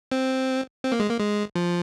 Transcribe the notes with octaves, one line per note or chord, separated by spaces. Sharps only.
C4
C4
A#3
G#3
A#3
G#3
F3